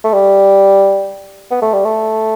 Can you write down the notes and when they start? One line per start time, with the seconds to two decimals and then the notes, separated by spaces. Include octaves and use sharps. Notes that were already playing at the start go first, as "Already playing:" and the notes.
0.04 A3
0.13 G3
1.51 B3
1.62 A3
1.73 G3
1.85 A3